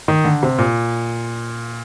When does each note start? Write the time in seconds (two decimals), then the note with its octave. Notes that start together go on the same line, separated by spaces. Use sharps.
0.08 D#3
0.25 D3
0.43 C3
0.58 A#2